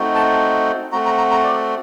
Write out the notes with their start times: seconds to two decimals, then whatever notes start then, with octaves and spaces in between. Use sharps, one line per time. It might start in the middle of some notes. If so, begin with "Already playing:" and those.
Already playing: A3 C4 D#4 F#4
0.15 A5
0.92 A3 C4 F#4 A#5
1.05 A#5
1.18 A#5
1.31 A#5
1.44 D5